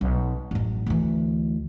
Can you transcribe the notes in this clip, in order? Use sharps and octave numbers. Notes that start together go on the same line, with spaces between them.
B1
A1 F#2
D2 E3